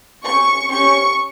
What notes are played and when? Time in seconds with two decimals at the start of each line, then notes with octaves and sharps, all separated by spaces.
0.24 C#4 G4 C#6
0.70 C#4 G4 C#6